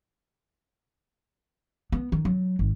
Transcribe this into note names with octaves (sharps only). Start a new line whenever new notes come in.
B3
D#3
F#3
G#1